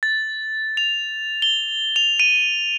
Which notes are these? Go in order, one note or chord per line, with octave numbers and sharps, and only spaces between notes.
A6
F7
G7
F7
D#7